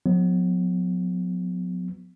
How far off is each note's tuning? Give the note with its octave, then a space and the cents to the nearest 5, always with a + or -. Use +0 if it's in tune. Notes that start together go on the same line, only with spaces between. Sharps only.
F#3 -45 B3 +20